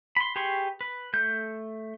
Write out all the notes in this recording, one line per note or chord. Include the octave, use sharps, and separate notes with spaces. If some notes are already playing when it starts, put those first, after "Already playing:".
B5 C6
G4 G#4 B4 C6 C#6
B4
A3 G6